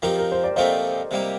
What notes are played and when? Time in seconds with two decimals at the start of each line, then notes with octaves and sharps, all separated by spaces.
0.02 F3 C4 D#4 G4 A#4
0.19 A#4
0.32 C5
0.44 D5
0.56 A#2 F3 A3 C4 D#4 C5 D#5
1.11 C3 G3 A#3